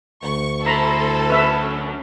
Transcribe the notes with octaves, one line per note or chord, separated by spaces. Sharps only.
D2 C#6
E4 A4 C5 A#5 B5
F#3 C#4 B4 E5